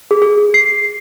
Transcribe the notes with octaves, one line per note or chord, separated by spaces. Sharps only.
G#4
G#4
C7